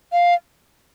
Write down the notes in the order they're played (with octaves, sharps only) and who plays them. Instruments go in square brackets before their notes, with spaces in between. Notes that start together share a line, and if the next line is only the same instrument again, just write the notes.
[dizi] F5